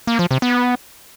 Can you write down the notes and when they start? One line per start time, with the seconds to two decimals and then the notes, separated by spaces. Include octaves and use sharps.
0.07 A#3
0.19 F3
0.31 C3
0.42 B3